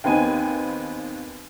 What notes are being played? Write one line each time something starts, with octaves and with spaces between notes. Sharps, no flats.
D#2 B3 C4 D#4 G#5